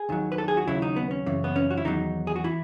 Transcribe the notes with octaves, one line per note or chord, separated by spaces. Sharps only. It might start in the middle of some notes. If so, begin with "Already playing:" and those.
Already playing: G#4
D#2 D#3 F#3
B4
A4
G#4
F#4
D#2 C#3 F#3 E4
D#4
B3
C#4
F#2 C#3 E3
B3
C#4
F#4
E4
E2 D#3 F#3 D#4
G#4
F#4
E3 E4